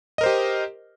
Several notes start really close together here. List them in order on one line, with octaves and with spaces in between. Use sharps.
D#5 A#4 C5 G4